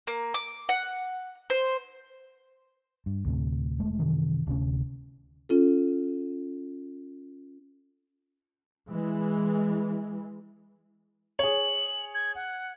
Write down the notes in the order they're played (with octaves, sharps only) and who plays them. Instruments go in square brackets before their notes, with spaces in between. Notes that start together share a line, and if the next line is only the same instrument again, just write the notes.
[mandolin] A#3
D6
F#5
C5
[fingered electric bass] G2
D2 A2 C3
E1 G#3 A3
F#2 C3 D#3 E3
D1 D2 C3 C#4
[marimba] C#4 F4 A4
[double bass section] E3 G#3
[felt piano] G#4 C#5 [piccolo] F#7
[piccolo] G#6
F#5